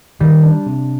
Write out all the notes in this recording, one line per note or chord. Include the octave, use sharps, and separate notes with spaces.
D#3 G3
D4
C3